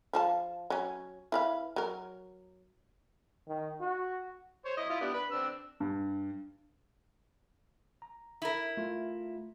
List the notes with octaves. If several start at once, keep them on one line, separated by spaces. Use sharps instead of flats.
F3 F4 A5
F#3 C#4
E4 B4 F5
F#3 A#4
D#3
F#4
C5 C#5
E4 D#5
E4 F4
G3 B3 D4
B4 B5
C4 D4 E6
G2
A#5
E4 A#4
A3 F4